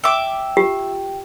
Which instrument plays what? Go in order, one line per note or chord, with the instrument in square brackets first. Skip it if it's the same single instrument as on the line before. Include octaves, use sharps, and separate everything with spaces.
[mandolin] E5 D6 [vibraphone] G5
[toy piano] F4 G4